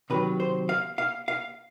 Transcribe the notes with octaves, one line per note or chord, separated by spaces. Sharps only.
C3 D#3 F#3 B4
C5
F5
F5
F5